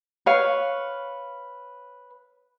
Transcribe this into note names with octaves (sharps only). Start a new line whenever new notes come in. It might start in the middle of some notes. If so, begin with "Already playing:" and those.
B4 C#5 F5 C#6